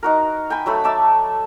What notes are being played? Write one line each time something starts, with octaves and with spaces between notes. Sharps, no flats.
D#4 F#4 A#4
G5 G#5 B5
F#3 A3 B5
E5 A5 D6